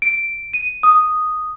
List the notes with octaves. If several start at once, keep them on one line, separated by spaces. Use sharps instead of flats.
D7
D#7
D#6